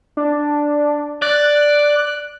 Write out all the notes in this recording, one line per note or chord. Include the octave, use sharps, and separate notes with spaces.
D4
D5 F#6